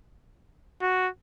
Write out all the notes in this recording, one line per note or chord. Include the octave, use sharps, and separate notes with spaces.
F#4